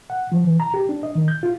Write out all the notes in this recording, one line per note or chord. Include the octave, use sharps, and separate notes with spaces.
F#5
F3
E3
A#5
G4
D4
D#5
D#3
G6
F4